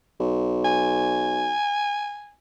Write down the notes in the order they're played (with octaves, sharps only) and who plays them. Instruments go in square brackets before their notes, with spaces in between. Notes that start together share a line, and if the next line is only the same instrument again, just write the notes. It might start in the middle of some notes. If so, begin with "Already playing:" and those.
[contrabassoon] B1
[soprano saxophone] G#5